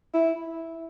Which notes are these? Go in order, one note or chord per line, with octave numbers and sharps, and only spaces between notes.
E4